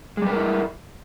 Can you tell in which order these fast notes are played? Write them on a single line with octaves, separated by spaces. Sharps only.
G#3 G3 B4 A#4 E4